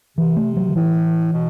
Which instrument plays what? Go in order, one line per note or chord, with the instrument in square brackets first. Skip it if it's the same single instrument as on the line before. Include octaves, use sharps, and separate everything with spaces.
[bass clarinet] C3 [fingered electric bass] E3
[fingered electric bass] A3
F#3
D3
[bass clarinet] A2 [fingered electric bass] E3
[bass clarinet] B2